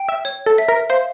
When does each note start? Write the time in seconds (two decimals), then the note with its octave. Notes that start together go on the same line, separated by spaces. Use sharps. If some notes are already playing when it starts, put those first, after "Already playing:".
Already playing: G5
0.09 E5
0.25 C#5
0.46 A4
0.58 E5
0.68 A#4
0.90 C5 F5